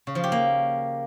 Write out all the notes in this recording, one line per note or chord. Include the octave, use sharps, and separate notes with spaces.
C#3
F3
G4
A#3